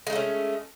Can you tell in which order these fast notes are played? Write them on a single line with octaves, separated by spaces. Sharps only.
G#3 D#4 A3 C#4